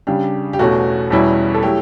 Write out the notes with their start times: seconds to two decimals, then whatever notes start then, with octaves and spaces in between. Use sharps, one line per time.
0.07 C#3 G3 D4 G4
0.53 G4
0.59 E2 B2 A3 C#4 F#4
1.11 E2 B2 G3 C#4 E4
1.54 A4
1.63 F#3 A3 E4 G4